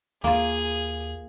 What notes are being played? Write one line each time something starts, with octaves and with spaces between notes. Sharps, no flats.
D#2 A#3 F4 G#4